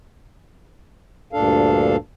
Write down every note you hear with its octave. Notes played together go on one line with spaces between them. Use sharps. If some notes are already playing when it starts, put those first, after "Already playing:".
D2 G2 A#2 D4 A4 F5